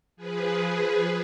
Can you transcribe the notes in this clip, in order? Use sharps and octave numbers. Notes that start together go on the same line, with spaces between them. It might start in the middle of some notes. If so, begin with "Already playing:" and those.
F3 G#4 B4